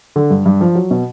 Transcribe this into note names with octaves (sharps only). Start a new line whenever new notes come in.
D3
G2
G2
F3
F#3
B2